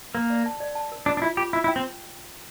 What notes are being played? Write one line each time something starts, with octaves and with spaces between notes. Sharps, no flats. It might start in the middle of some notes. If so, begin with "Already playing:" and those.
A#3 A#4
D5
A5
D5
A5
A#4
D4 F4
D4
E4 F4
F4 G4
E4 F4
E4
G5
C4